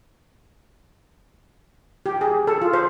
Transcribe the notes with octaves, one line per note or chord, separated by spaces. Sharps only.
G4
G#4
A4
F4
C5